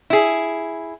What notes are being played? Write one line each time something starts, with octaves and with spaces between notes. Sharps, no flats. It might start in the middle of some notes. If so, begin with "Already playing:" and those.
E4 G#4